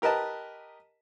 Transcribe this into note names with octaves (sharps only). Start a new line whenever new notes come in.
G4 A#4 B4 D#5 A5